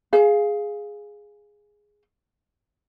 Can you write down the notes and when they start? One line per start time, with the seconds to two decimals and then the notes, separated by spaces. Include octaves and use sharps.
0.13 G#4 F5